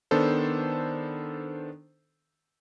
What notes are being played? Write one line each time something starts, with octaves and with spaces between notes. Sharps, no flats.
D#3 B3 D4 A4 C5